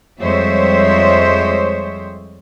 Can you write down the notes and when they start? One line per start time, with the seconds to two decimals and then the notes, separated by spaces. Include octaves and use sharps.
0.22 F2 G3 G#3 C5 C#5 E5